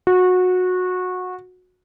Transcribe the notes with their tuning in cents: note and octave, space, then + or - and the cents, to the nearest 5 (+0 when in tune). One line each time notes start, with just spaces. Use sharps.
F#4 -20